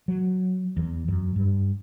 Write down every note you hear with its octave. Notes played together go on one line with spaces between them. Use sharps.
F#3
E2
F#2
G2